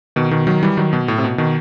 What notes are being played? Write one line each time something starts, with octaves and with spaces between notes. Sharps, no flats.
B2 D#3
B2 D#3
D#3 F#3
E3 G3
D#3 F#3
B2
A2
C3
B2
B2 D#3